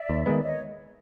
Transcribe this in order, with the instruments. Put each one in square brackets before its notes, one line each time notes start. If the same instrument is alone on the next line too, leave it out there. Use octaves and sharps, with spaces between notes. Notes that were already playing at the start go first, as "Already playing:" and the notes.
Already playing: [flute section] D5 E5
[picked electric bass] D#2
D#3 G#3 B3
[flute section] C#5 D#5